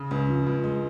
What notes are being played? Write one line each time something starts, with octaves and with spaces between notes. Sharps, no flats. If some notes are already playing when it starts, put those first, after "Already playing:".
Already playing: C#3
C#2
F3
C#2
G#3